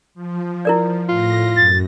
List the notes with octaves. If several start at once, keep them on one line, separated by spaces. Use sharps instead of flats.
F3
E4 A#4 D5
A2 F4 A#6
F#2 A6